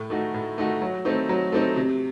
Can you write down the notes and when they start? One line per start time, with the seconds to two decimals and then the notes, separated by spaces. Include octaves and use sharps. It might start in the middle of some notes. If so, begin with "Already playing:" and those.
Already playing: A2
0.10 A3 D#4 F#4
0.34 A2
0.58 A3 D#4 F#4
0.82 F#3
1.05 A3 C4 D#4
1.29 F#3
1.52 A3 C4 D#4
1.76 C3